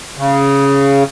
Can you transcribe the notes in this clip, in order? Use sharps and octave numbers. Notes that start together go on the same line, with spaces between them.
C#3